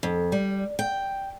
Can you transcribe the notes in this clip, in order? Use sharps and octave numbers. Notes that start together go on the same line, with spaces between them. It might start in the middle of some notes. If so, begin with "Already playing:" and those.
F2
G3
G5